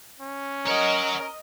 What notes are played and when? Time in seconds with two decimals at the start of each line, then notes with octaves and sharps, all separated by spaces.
0.20 C#4
0.67 A#4 C#5 D#5 F#5